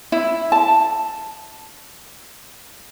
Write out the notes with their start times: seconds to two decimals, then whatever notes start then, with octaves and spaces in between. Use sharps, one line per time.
0.12 E4
0.52 A5